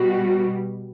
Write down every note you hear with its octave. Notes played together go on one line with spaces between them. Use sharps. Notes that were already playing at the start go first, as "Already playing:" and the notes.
Already playing: B2 G3 F#4